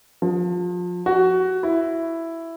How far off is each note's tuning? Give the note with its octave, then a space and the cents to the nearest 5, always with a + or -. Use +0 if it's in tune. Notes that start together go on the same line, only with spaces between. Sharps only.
F3 +30
F#4 +15
E4 +5